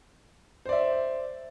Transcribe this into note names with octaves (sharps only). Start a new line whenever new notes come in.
C5 D5 E5